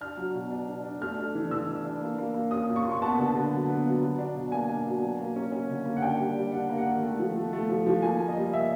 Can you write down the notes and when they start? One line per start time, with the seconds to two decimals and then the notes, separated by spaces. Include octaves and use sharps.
0.01 D4 F6
0.17 F#3
0.35 B2
0.50 D4
0.68 D4
0.84 D4
1.01 A3 F6
1.18 D4
1.35 E3
1.51 E3 E6
1.67 D4
1.85 D4
2.01 A#3
2.18 A#3
2.34 A#3
2.51 C#4 D#6
2.68 A#2
2.76 C#6
2.84 A#3 C6
2.91 C#6
3.01 B3 A5
3.18 D3
3.26 A5
3.35 D3
3.52 F#3
3.68 B3
3.85 F#3
4.02 F#3
4.19 D4
4.35 B2
4.52 A#3 G#5
4.69 D4
4.85 B2
5.02 F#3
5.19 A#3
5.36 C#4
5.52 C#4
5.69 D3
5.85 A#3
5.97 F#5
6.02 D4 G5
6.20 G3
6.36 G3
6.52 D4 F#5
6.69 A#3
6.78 F#5
6.86 D#3
7.03 A3
7.19 F3
7.36 A3
7.53 A3
7.69 F3
7.87 F3
8.02 A#3 G#5
8.19 A#3
8.28 D#5
8.37 G3
8.53 A#3 E5